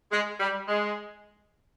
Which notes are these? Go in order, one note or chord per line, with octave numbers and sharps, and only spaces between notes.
G#3
G3
G#3